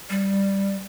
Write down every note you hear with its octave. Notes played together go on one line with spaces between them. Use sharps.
G3